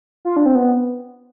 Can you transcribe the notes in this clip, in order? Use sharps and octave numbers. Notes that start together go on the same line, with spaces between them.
F4
D4
C4
B3